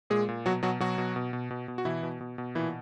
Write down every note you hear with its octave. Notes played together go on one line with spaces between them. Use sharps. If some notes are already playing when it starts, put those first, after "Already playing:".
A#2 G#3 G#4
A#2
B2 F#3 F#4
B2 F#3 F#4
B2 F#3 F#4
B2
B2
B2
B2
B2
F#4
B2 E3 E4
B2
B2
B2
A#2 E3 E4